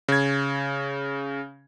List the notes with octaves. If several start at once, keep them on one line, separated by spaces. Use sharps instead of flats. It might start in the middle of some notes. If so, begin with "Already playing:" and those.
C#3 G#6